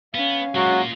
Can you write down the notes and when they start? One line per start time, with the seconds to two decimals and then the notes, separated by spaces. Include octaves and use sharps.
0.15 B3 C#4 F5
0.55 F#3 G#3 A#3 F4 F#4